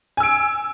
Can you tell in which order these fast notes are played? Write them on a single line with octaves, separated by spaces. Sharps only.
G#5 E6 D7